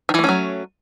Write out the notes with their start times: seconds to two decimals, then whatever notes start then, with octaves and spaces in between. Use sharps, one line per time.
0.09 D#3
0.14 E3
0.19 A3
0.24 C#4
0.29 F#3